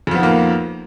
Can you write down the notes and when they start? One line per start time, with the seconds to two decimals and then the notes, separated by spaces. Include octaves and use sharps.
0.07 F2
0.11 F3
0.15 B3
0.19 D#3
0.23 A#3